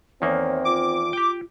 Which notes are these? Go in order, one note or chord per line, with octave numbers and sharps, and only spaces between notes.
E2 D#3 A#3 C4 C#5
F4 D6
G4 G5